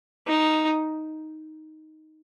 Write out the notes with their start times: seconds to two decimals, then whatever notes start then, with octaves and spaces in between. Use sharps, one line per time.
0.28 D#4